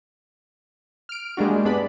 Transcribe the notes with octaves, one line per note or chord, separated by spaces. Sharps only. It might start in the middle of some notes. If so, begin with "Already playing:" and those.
F6 D7
G3 G#3 A#3 D4 F#4
G2 B3 D4 G#4 D5 B5